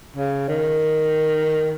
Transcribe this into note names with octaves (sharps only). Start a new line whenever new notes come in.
C#3
D#3